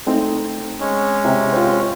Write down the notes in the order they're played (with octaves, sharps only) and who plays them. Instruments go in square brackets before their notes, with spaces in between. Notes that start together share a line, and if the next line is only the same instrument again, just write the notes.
[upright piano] A3 C4 D#4
[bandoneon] G#3 C#4
[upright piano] C3
F4 G4 C5